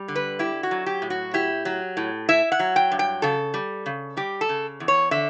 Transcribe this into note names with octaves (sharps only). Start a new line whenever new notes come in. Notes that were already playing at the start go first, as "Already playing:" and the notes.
Already playing: G3
D3
B4
E4 G4
F#4
F#3
G4
A2
F#4
E4 G4
F#3
A2
E4 E5
F#5
F#3
G5
G2
G5
C#3 A4
G3
C#3
G3 G4
A4
C#3
E2
C#5
D3 E5